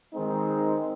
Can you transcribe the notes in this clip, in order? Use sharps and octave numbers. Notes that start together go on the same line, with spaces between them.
D#3 G#3 C4 D#4